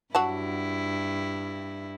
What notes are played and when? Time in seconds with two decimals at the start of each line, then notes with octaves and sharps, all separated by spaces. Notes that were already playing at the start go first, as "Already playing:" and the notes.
0.15 G2 F#3 E4 F#4 A5